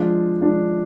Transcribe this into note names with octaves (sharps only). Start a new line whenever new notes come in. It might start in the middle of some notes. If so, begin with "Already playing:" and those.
Already playing: F3 G#3 D4 F4
F3 G#3 D4 F4